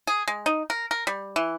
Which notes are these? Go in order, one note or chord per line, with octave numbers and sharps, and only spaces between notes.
G#4
G#3
D#4
A#4
A#4
G3
E3